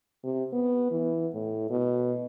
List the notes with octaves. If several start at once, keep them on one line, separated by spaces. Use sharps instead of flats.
C3
B3
E3
A2
B2